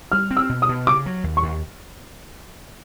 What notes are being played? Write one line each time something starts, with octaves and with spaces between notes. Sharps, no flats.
G3 F6
C4
E6
B2
D#6
B2
C#3 D6
F#3
D#2
C#6
D#2